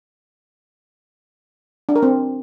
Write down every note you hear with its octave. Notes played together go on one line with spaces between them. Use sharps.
D4
A#4
C4